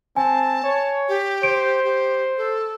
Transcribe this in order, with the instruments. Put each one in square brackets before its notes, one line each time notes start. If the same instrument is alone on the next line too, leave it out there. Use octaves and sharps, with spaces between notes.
[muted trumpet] C4 [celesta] G#5 [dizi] A5
[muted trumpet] C#5
[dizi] G4
[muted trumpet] C5 [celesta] D7
[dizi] G4
A4